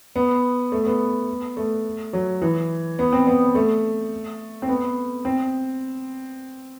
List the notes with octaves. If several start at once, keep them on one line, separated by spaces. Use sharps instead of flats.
B3
A3
B3
A3
F#3
E3
B3
C4
B3
A3
C4
B3
C4